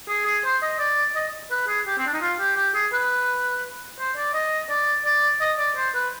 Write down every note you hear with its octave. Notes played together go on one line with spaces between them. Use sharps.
G#4
G#4
C5
D#5
D5
D#5
B4
G#4
G4
C4
D4
D#4
F4
G4
G4
G#4
B4
C5
D5
D#5
D5
D5
D#5
D5
C5
B4